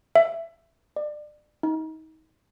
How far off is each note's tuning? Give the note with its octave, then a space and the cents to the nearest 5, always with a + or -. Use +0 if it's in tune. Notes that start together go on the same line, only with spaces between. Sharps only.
E5 +15
D5 +30
D#4 +30